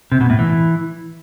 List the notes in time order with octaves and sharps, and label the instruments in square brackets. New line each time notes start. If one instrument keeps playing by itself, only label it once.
[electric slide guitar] C3
B2
A2
E3